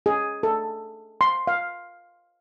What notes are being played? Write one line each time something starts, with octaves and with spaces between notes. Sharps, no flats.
G#4
A4
C6
F5